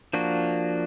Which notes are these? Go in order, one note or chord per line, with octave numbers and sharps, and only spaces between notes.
F3 A#3 D4 F#4